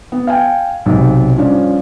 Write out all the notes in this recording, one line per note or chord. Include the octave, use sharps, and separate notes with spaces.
B3
F5 G5 G#5
B1 C3
G2 F3 C#4 D5